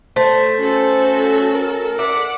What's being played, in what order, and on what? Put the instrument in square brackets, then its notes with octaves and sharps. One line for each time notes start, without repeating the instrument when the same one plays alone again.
[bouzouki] A3 [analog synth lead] C5
[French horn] C#4 [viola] F#4 A4
[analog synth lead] A#4
[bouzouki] E5 [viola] F#5 [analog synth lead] D6